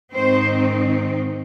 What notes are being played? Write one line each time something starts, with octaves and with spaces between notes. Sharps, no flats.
G#2 D#3 C4 D#4 C5